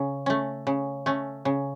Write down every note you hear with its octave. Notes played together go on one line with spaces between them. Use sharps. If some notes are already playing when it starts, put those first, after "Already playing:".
Already playing: C#3
A3 C#4
C#3
A3 C#4
C#3